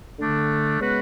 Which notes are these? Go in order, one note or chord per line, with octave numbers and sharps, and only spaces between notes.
D3 A3 D4
C#3 G#3 B3 F#4 B4